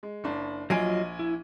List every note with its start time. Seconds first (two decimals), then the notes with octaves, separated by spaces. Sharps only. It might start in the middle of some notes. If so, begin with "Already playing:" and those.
0.03 G#3
0.24 F#1 D4
0.70 A#1 F#3 F4 D#5 G#5 D7
1.19 E4